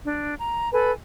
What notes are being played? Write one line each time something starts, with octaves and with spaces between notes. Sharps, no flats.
D4
A#5
A4 B4 G#5